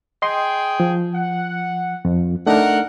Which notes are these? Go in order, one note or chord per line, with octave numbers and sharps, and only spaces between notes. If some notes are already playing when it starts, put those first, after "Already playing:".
G#4 D#5 G5 C6
F3
F#5
F2
A3 D4 D#4 A#4 F#5